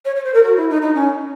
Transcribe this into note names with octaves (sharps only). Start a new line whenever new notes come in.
C#5
C#5
C5
A#4
F#4
E4
D#4
D#4
C#4